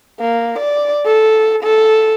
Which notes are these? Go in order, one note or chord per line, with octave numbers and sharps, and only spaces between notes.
A#3
D5
A4
A4